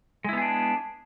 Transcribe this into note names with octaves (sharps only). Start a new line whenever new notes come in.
G#3 B3 D4 E4 G#4